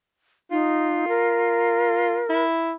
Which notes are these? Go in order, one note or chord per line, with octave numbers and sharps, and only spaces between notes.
D#4 F4
A#4
E4